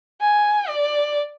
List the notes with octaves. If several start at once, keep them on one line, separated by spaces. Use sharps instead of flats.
G#5
D5